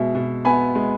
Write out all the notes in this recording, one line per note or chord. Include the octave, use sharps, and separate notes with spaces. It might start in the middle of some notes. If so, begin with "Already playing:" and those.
Already playing: B2 G#3 E5
B2
B3 G#5 B5
G#3